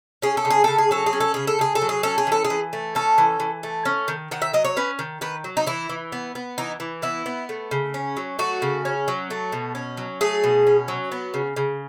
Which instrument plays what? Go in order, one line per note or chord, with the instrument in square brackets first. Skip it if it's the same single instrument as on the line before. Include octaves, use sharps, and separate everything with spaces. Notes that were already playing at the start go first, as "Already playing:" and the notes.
[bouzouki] C#4 G#4
A4
C#3
G#4
C#3 A4
G#4
F#3 A4
G#4
C#4
A4
C#3 G#4
A4
C#3 G#4
A4
F#3
G#4
C#4 A4
G#4
E3 A4
G#4
E3
A3
C#4 A4
E3
E3
A3
C#4
D#3
D#3 F#5
E5
F#3 D#5
C#5
C#4 B4
D#3
D#3 B4
F#3
D#4
E3 E4
E3
B3
B3
E3 D#4
E3
B3 E4
B3
A3
C#3
C#4
F#3
A3 F#4
C#3
C#4
F#3
A3
B2
C#4
F#3
A3 G#4
B2
C#4
F#3
B3
C#3
C#3